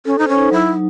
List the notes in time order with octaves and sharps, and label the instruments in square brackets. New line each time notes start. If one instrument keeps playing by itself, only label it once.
[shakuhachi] C#4 [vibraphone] A4
[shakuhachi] D#4 [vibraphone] C5
[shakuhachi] C#4
[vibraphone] D#4
[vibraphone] F#3 [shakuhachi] E4
[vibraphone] D#4